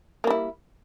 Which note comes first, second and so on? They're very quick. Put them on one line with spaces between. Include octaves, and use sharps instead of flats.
A#3 G3 E4